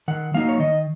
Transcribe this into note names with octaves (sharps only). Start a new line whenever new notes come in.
D#3 F#5
F#3 A#3 D#4 F5
C#5
D#3 D#5